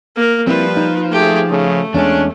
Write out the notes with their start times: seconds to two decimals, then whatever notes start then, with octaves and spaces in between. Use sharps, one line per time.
0.16 A#3 A#4
0.47 F3 G3 C4 E4 B4
0.77 D#4
1.12 A3 G4 G#4
1.50 C#3 A3
1.94 E2 G#3 C#4 D4